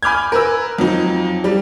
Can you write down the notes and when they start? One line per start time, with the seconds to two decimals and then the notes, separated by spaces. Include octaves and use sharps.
0.03 G#5 B5 D6 F6 G6 G#6
0.32 A#4 B4 E6
0.78 F2 F#3 D#4
1.44 G3